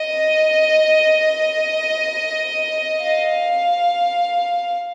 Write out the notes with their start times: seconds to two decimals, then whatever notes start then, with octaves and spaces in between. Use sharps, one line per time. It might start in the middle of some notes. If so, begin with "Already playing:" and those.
Already playing: D#5
3.02 F5